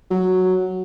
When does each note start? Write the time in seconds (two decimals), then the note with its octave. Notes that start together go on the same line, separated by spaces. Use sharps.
0.11 F#3